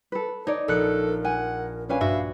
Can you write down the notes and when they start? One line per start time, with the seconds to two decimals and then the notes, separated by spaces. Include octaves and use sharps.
0.12 A4 B4
0.47 D#4 C#5 D5
0.68 A#1 A4 A#4 F#6 C#7
1.25 F#5 G#5
1.89 C#4 D4 B4 F5 G#5
2.01 G2 F#4 E5